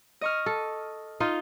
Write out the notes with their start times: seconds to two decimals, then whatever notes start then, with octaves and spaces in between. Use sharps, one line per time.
0.21 D#5 C#6 F6
0.46 A4
1.20 D#4 F4